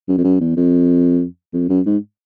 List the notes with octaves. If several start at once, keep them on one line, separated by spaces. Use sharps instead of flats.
F#2
F2
F#2
E2
F2
F2
F#2
G#2